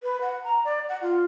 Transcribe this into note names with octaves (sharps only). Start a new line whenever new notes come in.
B4
F#5
A#5
D5
F#5
F4